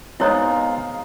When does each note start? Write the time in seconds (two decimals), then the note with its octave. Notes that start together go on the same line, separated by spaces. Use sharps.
0.20 G#3 B3 C4 D#4 E4 C#5 D#5 F5